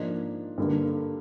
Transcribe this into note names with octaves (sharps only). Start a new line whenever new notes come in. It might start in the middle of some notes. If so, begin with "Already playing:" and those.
Already playing: G#2 F3 A#3 D4
G2 D3 G3 A#3